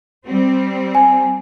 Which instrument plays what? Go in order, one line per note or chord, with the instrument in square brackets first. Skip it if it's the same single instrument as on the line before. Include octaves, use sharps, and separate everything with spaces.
[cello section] G3 C4
[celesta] G#5